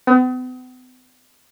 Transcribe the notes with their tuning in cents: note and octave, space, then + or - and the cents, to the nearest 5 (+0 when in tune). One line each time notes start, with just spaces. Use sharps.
B3 +45